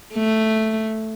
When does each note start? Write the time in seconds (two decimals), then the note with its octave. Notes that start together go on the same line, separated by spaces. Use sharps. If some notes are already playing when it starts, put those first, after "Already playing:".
0.14 A3